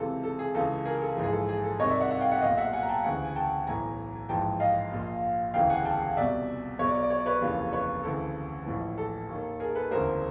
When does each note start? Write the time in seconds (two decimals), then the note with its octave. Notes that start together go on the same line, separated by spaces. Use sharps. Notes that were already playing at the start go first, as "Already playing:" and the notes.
Already playing: C#2 C3 E3 A4
0.23 A4
0.39 G#4
0.54 C#2 C#3 E3 A4
0.85 G#4 A#4
1.02 A4
1.17 A#1 G#2 E3
1.23 G#4
1.32 A4
1.49 G#4
1.64 A4
1.79 C2 C3 D#3 C#5 D#5
1.89 D5 E5
2.01 E5 F#5
2.11 E5 F#5
2.21 F5 G5
2.31 E5 F#5
2.41 B1 A#2 D#5 F5
2.57 E5 F#5
2.73 F#5 G#5
2.83 A#5
2.89 G5 A5
3.04 D2 C#3 E3 F#5 G#5
3.25 G#5
3.36 G5 A5
3.67 B1 A2 E3 G#5 A#5
4.29 A#1 G#2 E3 G5 A5
4.60 D#5 F5
4.92 A#1 A#2
5.54 E1 D2 C#3 E3 F5 G5
5.70 F#5 G#5
5.85 G5 A5
6.17 C2 B2 D5 E5
6.79 B1 B2 C#5
6.87 D5
6.95 C#5
7.03 D5
7.10 C#5
7.19 D5
7.26 B4 C#5
7.41 F1 D#2 C#3 E3
7.73 B4 C#5
8.04 D2 C#3 E3 A4
8.66 A#1 A2 E3
8.98 A4
9.29 D#2
9.34 D#3
9.60 G#4 A#4
9.75 A4 B4
9.91 E1 D2 C#3 E3 A#4 C5